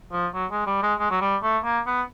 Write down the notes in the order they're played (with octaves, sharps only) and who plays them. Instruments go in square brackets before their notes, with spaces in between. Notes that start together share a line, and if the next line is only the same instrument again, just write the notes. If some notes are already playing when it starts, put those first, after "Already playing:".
[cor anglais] F3
F#3
G#3
G3
G#3
G#3
F#3
G3
A3
A#3
B3